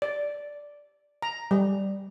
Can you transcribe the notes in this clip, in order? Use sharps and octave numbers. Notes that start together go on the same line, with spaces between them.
D5
A#5
G3